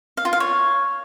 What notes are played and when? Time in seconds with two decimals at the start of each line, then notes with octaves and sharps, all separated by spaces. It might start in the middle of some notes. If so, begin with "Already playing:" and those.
0.17 F5
0.25 F4
0.33 F5
0.40 C#5